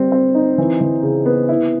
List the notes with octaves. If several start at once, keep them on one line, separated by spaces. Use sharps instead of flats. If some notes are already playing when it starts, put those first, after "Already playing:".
Already playing: G3 C4
C4
D#4
E3
E3
C#3
B3
E4